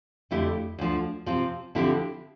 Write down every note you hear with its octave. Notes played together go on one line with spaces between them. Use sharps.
F2 D3 A3 E4 G4
D2 D3 F3
C3 F3 C4 F4
D3 F3 C4 E4 G4